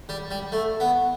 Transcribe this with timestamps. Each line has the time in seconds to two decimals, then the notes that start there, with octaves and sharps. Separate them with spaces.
0.09 G3
0.31 G3
0.52 A3
0.80 B3